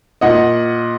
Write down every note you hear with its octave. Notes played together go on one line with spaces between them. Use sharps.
A#2 D#5 F#5